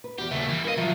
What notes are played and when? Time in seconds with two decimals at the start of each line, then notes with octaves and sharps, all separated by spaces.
0.04 B4
0.18 E2 F#4 G4
0.31 D#2 C#3 A3 E5
0.49 E3 G3
0.64 E4 A#4 B4 D#5 F5
0.77 F3 F#3 F4 E5 F5